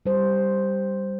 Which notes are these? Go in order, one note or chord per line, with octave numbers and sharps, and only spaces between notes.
G3 C5